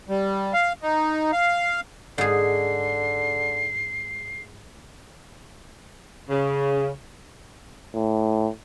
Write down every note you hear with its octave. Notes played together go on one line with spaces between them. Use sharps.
G3
F5
D#4
F5
G#2 D3 G#4 C7
C#3
A2